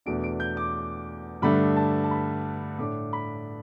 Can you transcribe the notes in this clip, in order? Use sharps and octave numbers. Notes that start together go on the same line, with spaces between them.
E2 B2 A3 D4 D7
D7
G6
D6
G2 D3 A3 D4 B5
A5
A5
B5
A2 A3 D4 D6
B5